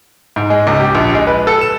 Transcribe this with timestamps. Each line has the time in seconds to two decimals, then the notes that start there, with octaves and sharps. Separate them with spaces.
0.36 G#2
0.50 G#3
0.67 C#2
0.80 G4
0.95 A#1
1.15 G#3
1.27 B4
1.47 A4
1.61 E7